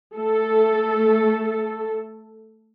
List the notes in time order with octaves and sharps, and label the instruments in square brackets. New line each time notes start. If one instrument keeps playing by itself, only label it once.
[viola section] A3 A4